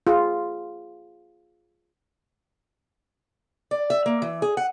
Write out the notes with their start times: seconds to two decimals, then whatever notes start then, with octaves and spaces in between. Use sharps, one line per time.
0.07 F4 G#4
3.71 D5
3.90 E5
4.06 A#3
4.22 E3
4.42 G#4
4.57 F#5